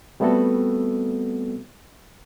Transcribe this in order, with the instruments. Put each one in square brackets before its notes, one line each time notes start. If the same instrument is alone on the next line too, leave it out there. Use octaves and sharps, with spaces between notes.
[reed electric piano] G3 A3 B3 C4 F#4 A4